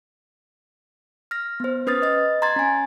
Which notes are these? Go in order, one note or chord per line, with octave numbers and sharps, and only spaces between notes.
F6 A#6
B3 C5
C#4 B4 D#6 F6 A6
D#5 A6
A#5 C6 G#6 A6
C#4 G#5